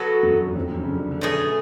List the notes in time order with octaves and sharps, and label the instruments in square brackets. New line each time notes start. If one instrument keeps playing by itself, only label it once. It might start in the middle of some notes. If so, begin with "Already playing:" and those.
Already playing: [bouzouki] F#3 B3 F#4 A4
[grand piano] F#2
F#2
F2
F#2
C#3
D3
C#3
D3
[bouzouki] B2 A3 C#4 G#4